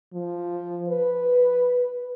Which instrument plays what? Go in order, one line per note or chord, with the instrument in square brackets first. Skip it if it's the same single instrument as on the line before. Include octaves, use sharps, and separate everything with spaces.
[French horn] F3
B4